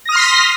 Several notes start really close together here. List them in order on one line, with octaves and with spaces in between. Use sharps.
A#6 D#6 F6 C6 B6